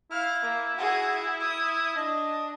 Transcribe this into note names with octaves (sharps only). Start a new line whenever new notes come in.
E4 F5 F6
A#3
F#4 G#4
D#6
D4 D#5